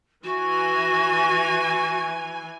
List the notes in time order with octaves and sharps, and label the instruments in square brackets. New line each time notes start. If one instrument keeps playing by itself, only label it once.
[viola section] E3 G#5 [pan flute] F#4